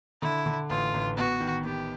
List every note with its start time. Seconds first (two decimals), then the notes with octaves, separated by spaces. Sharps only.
0.22 D3 E4
0.46 D3
0.70 A1 F4
0.94 A1
1.17 B3 F#4
1.40 D#3
1.65 B3 G4